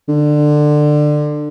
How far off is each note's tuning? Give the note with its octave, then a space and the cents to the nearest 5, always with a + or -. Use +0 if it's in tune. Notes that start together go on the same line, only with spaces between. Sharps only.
D3 +20